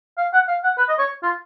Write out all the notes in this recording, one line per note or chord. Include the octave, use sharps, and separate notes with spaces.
F5
F#5
F5
F#5
B4
D#5
C#5
F4